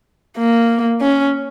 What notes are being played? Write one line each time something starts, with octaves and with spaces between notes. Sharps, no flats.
A#3
C#4